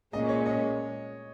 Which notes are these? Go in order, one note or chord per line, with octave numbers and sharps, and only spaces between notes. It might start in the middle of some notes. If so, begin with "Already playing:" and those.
A#2 G#3 C#4 D#5
C#5
D#5